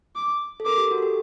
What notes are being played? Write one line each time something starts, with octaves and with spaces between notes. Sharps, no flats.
D6
A4
A#4 D6
G4
F#4
A4
G4